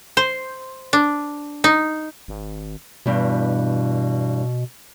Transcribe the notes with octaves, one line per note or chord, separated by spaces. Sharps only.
C5
D4
D#4
G#1
E2 G2 B2